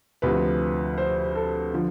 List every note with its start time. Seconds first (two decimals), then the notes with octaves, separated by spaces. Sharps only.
0.22 D2 C3 F3 B4
0.98 C5
1.35 A4
1.74 D3 F3